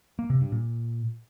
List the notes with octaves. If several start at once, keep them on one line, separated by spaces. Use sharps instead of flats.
A#3
C3
G2
A#2